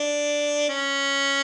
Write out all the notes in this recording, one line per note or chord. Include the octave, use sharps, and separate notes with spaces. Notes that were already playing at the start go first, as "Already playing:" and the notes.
Already playing: D4
C#4